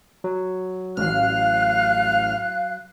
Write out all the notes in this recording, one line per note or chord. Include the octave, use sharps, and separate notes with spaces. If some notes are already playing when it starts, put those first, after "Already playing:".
F#3
A1 F5 F6 F#6